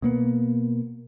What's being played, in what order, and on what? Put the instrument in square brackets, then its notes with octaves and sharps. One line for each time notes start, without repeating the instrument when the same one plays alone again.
[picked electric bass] B2 A#3 B3